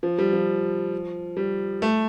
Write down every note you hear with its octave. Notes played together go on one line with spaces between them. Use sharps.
F3
G3
F3
G3
A3